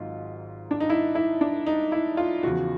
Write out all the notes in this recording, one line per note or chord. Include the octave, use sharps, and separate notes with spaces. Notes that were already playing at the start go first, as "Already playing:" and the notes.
Already playing: G#1 G#2 D#3 F#3 F4
D4
D#4
E4
E4
D4
D#4
E4
F4
E2 C#3 F3 F#4